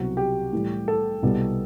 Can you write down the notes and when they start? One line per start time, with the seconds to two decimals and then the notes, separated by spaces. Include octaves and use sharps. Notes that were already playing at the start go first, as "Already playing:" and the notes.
Already playing: C2 B2 F#3 C4 F#4
0.17 G4
0.53 A2 E3 G3
0.88 A4
1.23 C2 B2 G3 B3